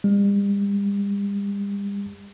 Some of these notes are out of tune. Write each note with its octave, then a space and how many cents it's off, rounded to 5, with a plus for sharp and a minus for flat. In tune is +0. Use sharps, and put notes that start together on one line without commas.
G3 +40